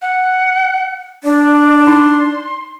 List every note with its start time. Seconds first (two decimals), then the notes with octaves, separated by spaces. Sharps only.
0.02 F#5
1.24 D4 D5
1.87 D#4 C6